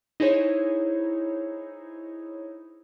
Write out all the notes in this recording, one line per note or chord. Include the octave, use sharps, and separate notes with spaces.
D#4 E4 G#4 C5 C#5